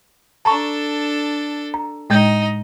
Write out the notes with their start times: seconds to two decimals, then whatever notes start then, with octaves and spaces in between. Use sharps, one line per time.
0.45 D4 A4 A5 A#5 C#6
1.74 A#5
2.10 A2 G#3 D#4 D#5 G6